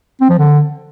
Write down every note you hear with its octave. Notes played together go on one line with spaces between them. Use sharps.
C4
F3
D3